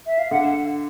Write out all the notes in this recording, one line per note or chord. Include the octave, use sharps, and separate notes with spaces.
E5
F5
D3 F#5